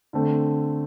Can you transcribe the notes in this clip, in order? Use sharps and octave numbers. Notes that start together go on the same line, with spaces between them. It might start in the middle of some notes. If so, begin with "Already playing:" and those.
D3 A3 C4